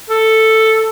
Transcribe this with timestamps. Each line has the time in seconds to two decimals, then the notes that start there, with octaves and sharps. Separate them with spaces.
0.10 A4